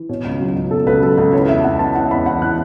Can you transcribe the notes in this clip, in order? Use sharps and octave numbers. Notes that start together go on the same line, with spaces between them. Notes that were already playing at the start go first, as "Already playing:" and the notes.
Already playing: E3
B2 C#5
C#2
F#3
C#2
B2 A4
C#2 B4
F#3 A4
C#2 B4
E3 C#5
E2 E5
A5
E2 F#5
E3 A5
E3 F#5
E2 B5
E2 F#5
E3 F#6